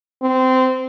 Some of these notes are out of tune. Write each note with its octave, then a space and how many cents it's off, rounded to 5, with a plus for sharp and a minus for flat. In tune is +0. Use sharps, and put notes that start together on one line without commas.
C4 -20